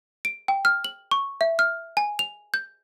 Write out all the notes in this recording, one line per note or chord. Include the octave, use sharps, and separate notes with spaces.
D7
G5
F6
F#7
C#6
E5
F6
G#5
F7
G6